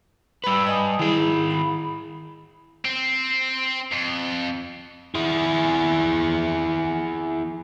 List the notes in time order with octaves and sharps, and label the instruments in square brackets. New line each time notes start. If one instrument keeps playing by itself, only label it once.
[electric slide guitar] G3 B4 [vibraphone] B5 E6
[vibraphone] D#5 G#5 D#6
[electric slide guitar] D#3 G#4 [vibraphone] E4
[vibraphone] B5
[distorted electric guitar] C4
F2
E4 G#4